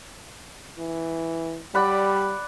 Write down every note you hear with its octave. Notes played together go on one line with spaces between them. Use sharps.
E3
G3 D5 F#5 B5